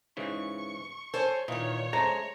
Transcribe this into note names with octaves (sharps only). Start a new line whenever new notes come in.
G#2 C#3 E3 C#6
A4 C5 C#5 G#5
A#2 D#3 E3 D#4 C#5
G#3 A3 C5 A#5